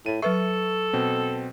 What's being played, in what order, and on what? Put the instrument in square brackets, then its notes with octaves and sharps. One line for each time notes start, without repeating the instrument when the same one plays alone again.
[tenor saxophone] A2 [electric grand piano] D#7
[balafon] F#3 B4 E5 [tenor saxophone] A4 [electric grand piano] C#6
[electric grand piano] B2 C4